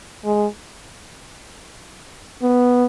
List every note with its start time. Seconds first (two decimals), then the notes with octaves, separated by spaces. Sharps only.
0.25 G#3
2.42 B3